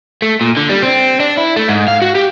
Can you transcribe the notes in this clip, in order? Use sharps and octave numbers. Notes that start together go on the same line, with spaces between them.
A3
A#2
D3
G3
C4
D4
E4
A3
G#2
F5
F#4
G4